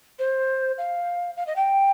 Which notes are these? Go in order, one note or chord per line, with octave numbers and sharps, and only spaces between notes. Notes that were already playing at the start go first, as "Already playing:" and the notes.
C5
F5
F5
D#5
G5